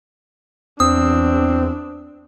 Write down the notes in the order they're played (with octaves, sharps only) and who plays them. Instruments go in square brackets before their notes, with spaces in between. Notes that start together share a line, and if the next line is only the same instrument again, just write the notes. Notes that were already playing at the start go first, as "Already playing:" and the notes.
[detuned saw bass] E2 [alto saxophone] C4 [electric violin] D4 [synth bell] D#6